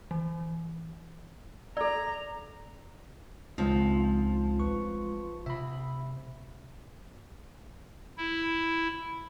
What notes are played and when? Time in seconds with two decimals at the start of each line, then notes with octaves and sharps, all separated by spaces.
0.11 E3
1.77 A4 D5 A#5
3.58 C#2 F3 G#3 C4 D#4
4.60 A1 B4 C#6
5.46 C3 E5 B5
8.18 E4